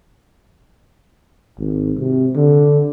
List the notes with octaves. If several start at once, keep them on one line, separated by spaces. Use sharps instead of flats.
G#1
C3
D3